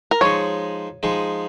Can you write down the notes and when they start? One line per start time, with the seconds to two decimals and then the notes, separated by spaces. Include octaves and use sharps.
0.11 A#4
0.21 F3 G#3 D#4 G#4 C#5
1.03 F3 G#3 D#4 G#4